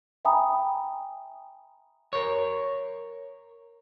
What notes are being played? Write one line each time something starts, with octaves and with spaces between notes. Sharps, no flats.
E5 G5 G#5 A#5 B5 D#6
A#4 C#5